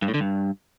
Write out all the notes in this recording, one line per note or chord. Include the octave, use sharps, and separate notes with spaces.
G2
A2
D3
G2